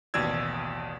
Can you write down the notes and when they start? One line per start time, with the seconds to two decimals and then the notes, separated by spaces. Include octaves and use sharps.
0.14 A1 D#2 B2 D5 E6 G#6